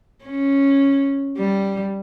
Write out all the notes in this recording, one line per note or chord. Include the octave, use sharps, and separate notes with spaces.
C#4
G3